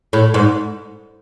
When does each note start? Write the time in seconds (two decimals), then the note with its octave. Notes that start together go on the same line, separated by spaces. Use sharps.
0.13 A2
0.34 G#2